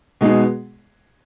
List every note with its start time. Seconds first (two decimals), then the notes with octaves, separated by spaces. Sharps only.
0.21 B2 G#3 B3 D#4 G#4